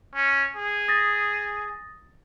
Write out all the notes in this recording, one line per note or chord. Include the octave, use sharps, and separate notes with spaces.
C#4
G#4
D#6 A6 A#6